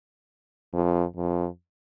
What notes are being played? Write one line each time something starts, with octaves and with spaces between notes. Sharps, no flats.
F2
F2